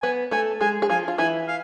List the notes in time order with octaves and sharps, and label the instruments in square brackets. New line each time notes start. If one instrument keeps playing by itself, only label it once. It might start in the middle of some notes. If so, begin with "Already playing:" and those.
[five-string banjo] B3 B4 [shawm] G#5
[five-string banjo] A3 A4 [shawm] G#5
[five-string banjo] G#3 G#4 [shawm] G#5
[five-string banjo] G#4
[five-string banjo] F3 F4 [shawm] G#5
[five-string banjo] F4
[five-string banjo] E3 E4 [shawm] G#5
[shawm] F5